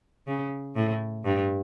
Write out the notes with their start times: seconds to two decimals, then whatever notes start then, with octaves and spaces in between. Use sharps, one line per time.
0.27 C#3
0.76 A2
1.25 G2